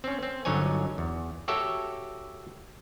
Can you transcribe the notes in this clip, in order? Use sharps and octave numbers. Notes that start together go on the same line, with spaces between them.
C4 C#4
C4
G1 D3 F#3 D#4 C#5 G#5
E2
F#4 G4 A4 C#5 E5